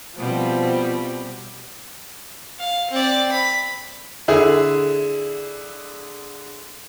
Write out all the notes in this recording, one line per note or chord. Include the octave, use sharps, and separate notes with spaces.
B2 F3 G3 C4
F5
C4 D5
B5
D3 E4 G#4